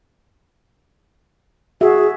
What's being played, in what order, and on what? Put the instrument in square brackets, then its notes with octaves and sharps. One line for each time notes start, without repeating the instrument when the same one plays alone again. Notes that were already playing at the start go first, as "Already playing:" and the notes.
[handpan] F#4 E5 [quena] G#4